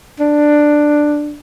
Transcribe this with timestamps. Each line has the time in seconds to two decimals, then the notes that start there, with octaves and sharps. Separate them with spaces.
0.20 D4